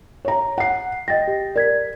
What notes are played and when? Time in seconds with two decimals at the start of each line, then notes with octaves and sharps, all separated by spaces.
0.25 C#5 A#5
0.58 F#5 C7
1.08 D#5 G5 A6 A#6
1.28 G4
1.56 A#4 D5 G#6 B6